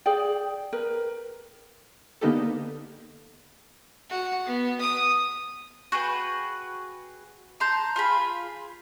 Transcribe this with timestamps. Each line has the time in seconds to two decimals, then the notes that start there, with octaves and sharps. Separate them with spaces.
0.06 G#4 D5 G5
0.73 A#4 B4
2.21 D3 A#3 B3 D#4 G4 A4
4.10 F#4
4.46 B3
4.80 D#6
5.92 F#4 G#4 B4 G5
7.60 A5 A#5 C6 G6
7.96 F4 G#4 B5